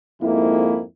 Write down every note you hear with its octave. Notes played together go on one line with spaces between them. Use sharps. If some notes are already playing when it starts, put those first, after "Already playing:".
F2 G#2 A#3 E4